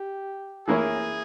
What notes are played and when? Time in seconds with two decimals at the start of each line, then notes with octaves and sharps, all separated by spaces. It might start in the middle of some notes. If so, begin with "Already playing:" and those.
Already playing: G4
0.67 E3 A#3 E4 G#4 A#4 C#5